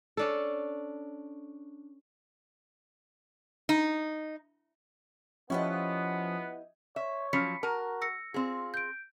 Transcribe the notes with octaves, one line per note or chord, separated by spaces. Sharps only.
C#4 D4 A4
D#4
F3 B3 C#4 E4 G4 D#5
C#5 E5
F3 F#3 C#4 B5 B6 C#7
F#4 A#4 A5 A#5
E6 A#6 C#7
C4 F4 G#4
G6 D7